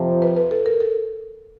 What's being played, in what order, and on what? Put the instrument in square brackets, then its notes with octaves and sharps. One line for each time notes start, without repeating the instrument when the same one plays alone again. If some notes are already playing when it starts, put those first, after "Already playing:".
Already playing: [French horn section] F2 C3 F3
[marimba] B4
B4
A4
A#4
A4